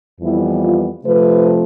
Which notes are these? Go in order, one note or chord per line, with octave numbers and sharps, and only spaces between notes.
F2 E3 G3 B3 E4
F4
C3 F3 A3 C4 B4